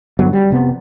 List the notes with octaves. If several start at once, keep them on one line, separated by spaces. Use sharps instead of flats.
G2 D3 F#3 B3
G3
F1 C3 B3